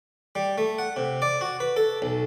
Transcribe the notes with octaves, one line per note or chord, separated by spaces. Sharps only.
G3
A3
F#5
C3
D5
F#4
B4
A4
B1